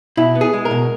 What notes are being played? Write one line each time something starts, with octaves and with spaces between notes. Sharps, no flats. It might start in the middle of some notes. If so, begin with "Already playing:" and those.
B2 E4
B3
G#4
G#3
A#4
B2